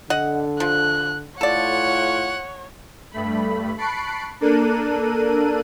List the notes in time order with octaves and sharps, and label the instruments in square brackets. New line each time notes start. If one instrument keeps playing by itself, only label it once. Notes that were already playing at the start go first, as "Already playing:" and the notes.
[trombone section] D3 [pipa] D#5 F#5
[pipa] F3 [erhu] F#6
[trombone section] A2 F4 [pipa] A4 D5 [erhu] C#5 [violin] F#5
[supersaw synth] G2 A3 B5
A5 B5 C#6 F#6 C7 D7
A#3 D4 A4 A#4 F#6 D#7